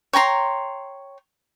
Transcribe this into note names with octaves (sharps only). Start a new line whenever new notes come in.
C#5 G5 A#5 C6